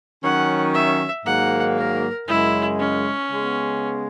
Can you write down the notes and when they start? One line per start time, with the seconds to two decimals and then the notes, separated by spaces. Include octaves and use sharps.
0.23 D#3 F#3 C#4 F#5
0.74 E5
1.25 G#2 D#3 F#3 A#3 F#5
1.77 A#4
2.28 F#2 C#3 G#3 E4
2.79 C#4
3.30 C#3 G#3 B3